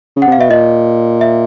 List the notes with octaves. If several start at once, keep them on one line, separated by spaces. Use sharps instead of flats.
C#3
F#5
C3
F5
B2 E5
A#2 D#5
E5